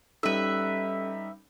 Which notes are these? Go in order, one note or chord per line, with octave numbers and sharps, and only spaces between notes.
G3 C#4 D#4 A4 B4 E5